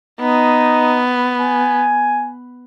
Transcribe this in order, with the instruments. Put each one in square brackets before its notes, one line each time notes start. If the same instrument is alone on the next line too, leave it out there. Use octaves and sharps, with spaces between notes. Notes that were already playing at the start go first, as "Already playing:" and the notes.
[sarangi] B3 [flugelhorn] D#4
[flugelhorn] G#5